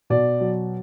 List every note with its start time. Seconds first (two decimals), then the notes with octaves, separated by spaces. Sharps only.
0.10 B2 D5
0.41 F#3